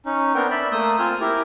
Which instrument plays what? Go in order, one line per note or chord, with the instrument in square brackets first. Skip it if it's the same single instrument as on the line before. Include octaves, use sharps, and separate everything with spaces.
[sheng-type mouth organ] C#4 D#4
B3 C4 D4 A#4 G5
D5 E5 B5
A3 A#3 D#6 E6 G6
C4 F4 G#5 F6
E4 G4 A#4